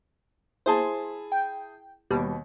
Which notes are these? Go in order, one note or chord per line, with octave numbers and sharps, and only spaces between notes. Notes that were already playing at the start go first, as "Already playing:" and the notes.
E4 G#4 C5 A5
G5
D#2 B2 G3